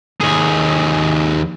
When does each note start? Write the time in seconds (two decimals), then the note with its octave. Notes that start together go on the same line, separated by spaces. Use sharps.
0.21 D#2 G#4